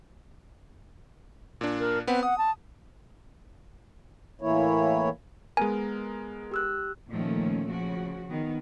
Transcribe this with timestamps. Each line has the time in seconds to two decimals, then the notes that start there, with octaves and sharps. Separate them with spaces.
1.61 A#2 D4
1.79 A#4
2.07 B3 C4 B4 F#5
2.23 F#5 D#6
2.38 A5
4.41 A2 E3 A#3 E4 C#5
5.57 G#3 B3 A#4 G#5
6.51 G4 E6 F#6
7.11 A#2 D#3 F3 A3 C#4
7.70 C#3 F3 F#4
8.30 D#3 B3